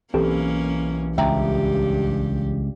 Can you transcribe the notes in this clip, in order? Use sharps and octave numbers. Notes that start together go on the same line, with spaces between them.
B1 E3 A#3 C4 C#4 G4 A4
C#2 G2 G4 E5 G5 A#5